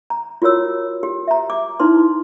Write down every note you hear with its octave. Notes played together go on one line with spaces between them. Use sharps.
A#5
F4 F#4 A#4 C#5 E6
G4
E5 A#5
D6
D#4 E4 B4 C6